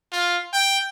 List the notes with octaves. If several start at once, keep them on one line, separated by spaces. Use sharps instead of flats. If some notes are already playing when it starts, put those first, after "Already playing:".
F4
G5